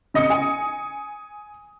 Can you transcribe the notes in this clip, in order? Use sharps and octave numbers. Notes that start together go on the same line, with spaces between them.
C#3 D#5 D#6 C#7
G#5